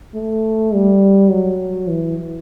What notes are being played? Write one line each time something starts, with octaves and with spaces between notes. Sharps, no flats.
A3
G3
F#3
E3